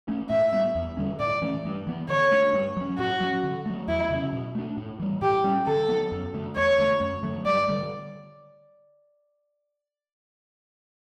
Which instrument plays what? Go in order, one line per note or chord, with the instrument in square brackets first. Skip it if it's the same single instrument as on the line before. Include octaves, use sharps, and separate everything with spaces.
[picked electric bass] A3 C#4
[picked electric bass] A2 [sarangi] E5
[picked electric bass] G3 B3
E2
D3 G3 C#4
[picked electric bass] A2 [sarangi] D5
[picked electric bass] E3 A3 C#4
G2
E3 B3
[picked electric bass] D3 [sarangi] C#5
[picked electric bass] A3 D4
G2
F#3 C#4
[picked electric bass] A2 [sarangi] F#4
[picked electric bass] F#3 C#4
D3
F#3 A3
[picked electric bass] E2 [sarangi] E4
[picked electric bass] C#3 F#3 C#4
B2
A3 D4
A2
E3 G3
[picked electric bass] A2 [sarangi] G4
[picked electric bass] G3 C#4
[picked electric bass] D3 [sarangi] A4
[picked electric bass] F#3 B3
F#2
D3 A3
[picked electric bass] E2 [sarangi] C#5
[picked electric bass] D3 A3
F#2
D3 F#3 A3
[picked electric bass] G2 [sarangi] D5
[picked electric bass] D3 G3